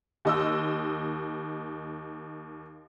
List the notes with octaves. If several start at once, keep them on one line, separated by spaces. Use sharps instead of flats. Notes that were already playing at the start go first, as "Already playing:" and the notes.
D#2 D#5 E6